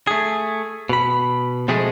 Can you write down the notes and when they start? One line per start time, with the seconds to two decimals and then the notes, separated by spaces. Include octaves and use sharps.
0.07 A3 G#4
0.89 B2 B5
1.68 B2 F3 G#3 A3 C4 G#4